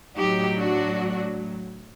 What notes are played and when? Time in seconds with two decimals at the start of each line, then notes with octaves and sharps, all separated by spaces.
0.16 A2 F#3 D#4 G4
0.58 D4 F#4